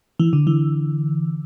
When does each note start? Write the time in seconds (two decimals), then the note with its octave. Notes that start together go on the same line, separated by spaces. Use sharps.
0.20 E3
0.33 D3
0.47 E3